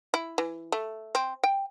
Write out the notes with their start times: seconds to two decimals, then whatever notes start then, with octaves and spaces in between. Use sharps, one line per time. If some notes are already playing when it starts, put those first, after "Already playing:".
0.14 E4
0.38 E3
0.72 A3
1.15 C4
1.44 G5